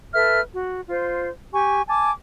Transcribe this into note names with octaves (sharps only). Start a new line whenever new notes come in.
A4 B4 E5 F6
F#4
F4 C5
G4 G#5 C#6
G#5 A5 D6